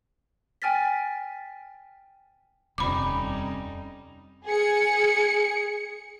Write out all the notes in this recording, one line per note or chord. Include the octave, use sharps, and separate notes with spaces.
G5 G#5 F6 A6 B6
D#1 F2 C3 G3 C#4 D#4 B5 D6
G#4 C#7